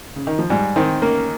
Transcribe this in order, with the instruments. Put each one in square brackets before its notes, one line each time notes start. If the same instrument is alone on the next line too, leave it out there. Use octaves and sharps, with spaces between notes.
[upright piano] C#3
D#3
F3
[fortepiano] G#2 [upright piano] G3
[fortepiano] D#3 [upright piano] C4
[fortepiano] A#3 [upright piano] C#4